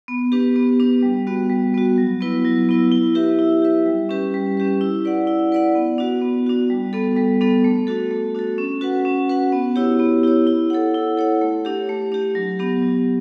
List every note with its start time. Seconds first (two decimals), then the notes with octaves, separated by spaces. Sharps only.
0.08 B3
0.32 D4 G4 B4
0.56 B3
0.80 D4 G4 B4
1.03 G3
1.27 B3 F#4
1.50 G3
1.74 B3 F#4
1.98 F#3
2.21 B3 E4 B4
2.45 F#3
2.69 B3 E4 B4
2.92 E4
3.15 G4 B4 E5
3.39 E4
3.62 G4 B4 E5
3.86 G3
4.09 C#4 G4 B4
4.34 G3
4.57 C#4 G4 B4
4.81 E4
5.05 B4 D5 F#5
5.27 E4
5.52 B4 D5 F#5
5.75 B3
5.98 D4 F#4
6.22 B3
6.46 D4 F#4
6.70 G3
6.93 B3 D4 A4
7.16 G3
7.41 B3 D4 A4
7.64 A3
7.87 D4 F#4 A4
8.11 A3
8.35 D4 F#4 A4
8.58 C#4
8.81 F#4 B4 F#5
9.05 C#4
9.29 F#4 B4 F#5
9.52 B3
9.76 E4 G4 C#5
9.99 B3
10.23 E4 G4 C#5
10.47 E4
10.70 A4 C#5 F#5
10.95 E4
11.17 A4 C#5 F#5
11.41 A3
11.65 D4 G4
11.89 A3
12.12 D4 G4
12.35 F#3
12.59 B3 D4 G4
12.82 F#3